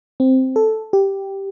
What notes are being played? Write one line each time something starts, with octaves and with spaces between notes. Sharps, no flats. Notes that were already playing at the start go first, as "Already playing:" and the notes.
C4
A4
G4